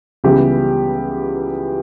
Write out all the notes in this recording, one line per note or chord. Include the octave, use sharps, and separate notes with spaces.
C#2 C#3 E3 G3 B3 G4